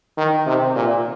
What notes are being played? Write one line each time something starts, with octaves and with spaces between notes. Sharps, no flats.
D#3
C3
A#2